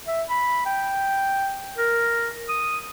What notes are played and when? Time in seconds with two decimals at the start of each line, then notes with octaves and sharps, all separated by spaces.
0.07 E5
0.29 B5
0.66 G5
1.78 A#4
2.49 D#6